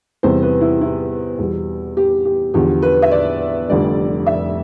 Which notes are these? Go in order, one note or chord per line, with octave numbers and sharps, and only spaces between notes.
E2 C3 E3 G3 C5
B4
E4
E4
E2 B2 G3
G4
G4
E2 D3 F3 G4
B4
E5
D5
F1 F2 D3 G3 D5
E5